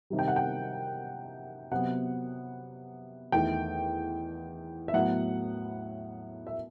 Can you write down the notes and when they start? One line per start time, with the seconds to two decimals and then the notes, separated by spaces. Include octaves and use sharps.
0.10 C3 D#3 G3
0.19 G5
0.28 F#5
0.36 G5
1.71 C3 F#3 B3 F#5
3.32 E2 D#3 A3 G5
4.88 E5
4.93 A2 F#3 B3 F#5
6.47 E5